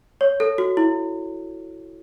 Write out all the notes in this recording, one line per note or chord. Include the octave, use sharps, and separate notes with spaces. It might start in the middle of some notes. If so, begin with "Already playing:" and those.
C#5
A4
F#4
E4